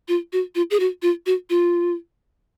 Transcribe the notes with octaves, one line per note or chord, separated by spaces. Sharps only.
F4
F#4
F4
G#4
F#4
F4
F#4
F4